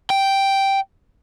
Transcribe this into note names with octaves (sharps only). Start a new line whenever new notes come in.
G5